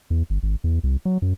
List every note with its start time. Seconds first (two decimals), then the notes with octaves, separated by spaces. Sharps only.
0.10 E2
0.30 G1
0.43 G#1
0.64 E2
0.83 C2
1.05 F#3
1.22 F#2